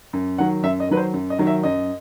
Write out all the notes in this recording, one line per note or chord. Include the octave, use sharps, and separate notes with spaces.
F#2
D#3 F#3 F#5
F#2 E5
D#5
D#3 F#3 B4
C5
F#2
D#5
D#3 F#3
E5
F#2 D#5